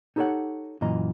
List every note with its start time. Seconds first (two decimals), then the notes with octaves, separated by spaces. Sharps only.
0.16 D#4 G4 A4 C5 C#5 F#5
0.81 F#2 A#2 E3 D#5 A#5